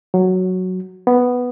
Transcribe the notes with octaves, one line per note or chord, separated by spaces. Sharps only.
F#3
B3